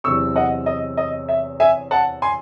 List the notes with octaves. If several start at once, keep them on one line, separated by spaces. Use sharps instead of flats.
E2 C3 F#3 C4 C#6 E6
D#5 F#5
D#5
D#5
E5
E5 G#5
F#5 A5
G#5 C6